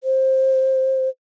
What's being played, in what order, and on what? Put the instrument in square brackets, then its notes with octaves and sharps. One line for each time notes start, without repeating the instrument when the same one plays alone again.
[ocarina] C5